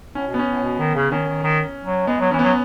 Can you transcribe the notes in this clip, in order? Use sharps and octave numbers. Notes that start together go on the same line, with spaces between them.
A2 C#4
B2
B3
C#4
A2
B2
D#3
C#3
D#3 C#4
D#3
D#3
F#3
G#3 B3
F#3
E3 C#4
B3
F#3